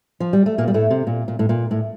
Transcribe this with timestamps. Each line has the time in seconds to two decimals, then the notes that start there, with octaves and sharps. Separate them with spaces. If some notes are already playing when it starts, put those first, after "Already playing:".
0.20 F3
0.33 G3
0.46 A3
0.58 A#2 A#3
0.68 G3
0.74 A2 A3
0.90 C3
1.07 A#2
1.28 A#2
1.39 A2
1.49 A#2
1.71 A2